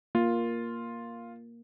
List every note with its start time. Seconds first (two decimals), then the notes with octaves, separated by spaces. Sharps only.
0.15 A#3 F4